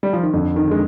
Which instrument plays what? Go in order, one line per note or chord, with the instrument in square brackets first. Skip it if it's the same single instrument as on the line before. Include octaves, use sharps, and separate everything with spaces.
[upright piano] G3
F3
D#3
[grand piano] F2 [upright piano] D3
[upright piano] D#3
[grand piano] D3 [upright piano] G#3